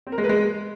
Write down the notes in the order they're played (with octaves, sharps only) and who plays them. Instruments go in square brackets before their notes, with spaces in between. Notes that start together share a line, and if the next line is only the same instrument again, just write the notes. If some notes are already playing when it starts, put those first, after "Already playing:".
[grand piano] C4
A#4
G#3
B4
G#3